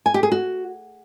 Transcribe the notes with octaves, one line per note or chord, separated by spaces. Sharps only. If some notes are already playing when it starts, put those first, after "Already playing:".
G#5
G4
G#4
F#4